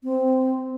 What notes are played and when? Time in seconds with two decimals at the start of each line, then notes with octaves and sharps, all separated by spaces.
0.03 C4